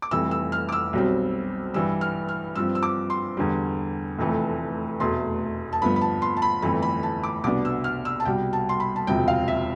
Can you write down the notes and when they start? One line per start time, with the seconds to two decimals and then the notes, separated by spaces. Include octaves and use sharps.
0.02 D6
0.11 F1 F2 E3 G3 E6
0.31 E6
0.52 F6
0.69 D6
0.72 E6
0.93 B1 B2 G3 C4
1.74 G2 E3 G3 E6
2.01 F6
2.29 F6
2.55 G2 F3 C4 E6
2.75 E6
2.83 D6
3.10 C6
3.37 E2 D3 G3
4.19 F1 F2 E3 A3
5.00 F1 E2 B2 A3 C6
5.73 A5
5.81 G1 G2 F3 B3 B5
5.96 B5
6.01 A5
6.22 C6
6.37 A5
6.42 B5
6.62 G1 F2 E3 A3 B5
6.82 B5
7.03 A5
7.23 D6
7.43 C2 B2 B3 D4 D6
7.65 E6
7.84 F6
8.05 E6
8.20 A5
8.25 C2 B2 G3 G5
8.53 A5
8.69 C6
8.80 B5
8.96 A5
9.07 E1 D2 C3 F3 G5
9.28 F5
9.48 E5